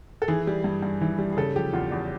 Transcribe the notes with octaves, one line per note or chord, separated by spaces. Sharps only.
A4
E3 G#4
G3
G2
G2
E3
G3
G#4
C#3 A4
F3 G4
E2 F4
E2